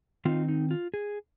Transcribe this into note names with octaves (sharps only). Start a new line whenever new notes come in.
D#3 C4 D#4 F4
D#4
F4
G#4